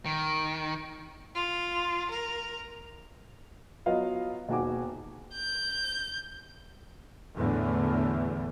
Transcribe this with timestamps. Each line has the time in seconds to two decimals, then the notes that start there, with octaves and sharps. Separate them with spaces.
0.06 D#3
1.35 F4
2.10 A#4
3.86 F#3 B3 F4 D#5 F5
4.49 E1 D#2 F#4 G#5 D6
5.35 G6
7.36 E2 A2 D3